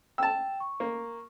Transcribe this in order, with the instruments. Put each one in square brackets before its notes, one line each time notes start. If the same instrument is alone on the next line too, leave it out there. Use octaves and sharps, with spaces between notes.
[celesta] G5 [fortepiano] A5 E6
[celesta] C#6
[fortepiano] A#3